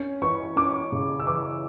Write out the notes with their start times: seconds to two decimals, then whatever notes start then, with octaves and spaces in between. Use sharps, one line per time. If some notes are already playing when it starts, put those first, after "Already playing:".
Already playing: C#4
0.22 E3 C#6
0.56 C#4 D6
0.92 C#3
1.20 E6
1.27 E3 D6